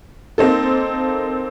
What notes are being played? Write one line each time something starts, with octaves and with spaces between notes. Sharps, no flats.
A#3 C4 D#4 A4